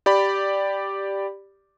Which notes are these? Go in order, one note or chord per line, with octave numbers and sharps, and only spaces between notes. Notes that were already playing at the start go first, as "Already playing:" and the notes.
G4 D5 B5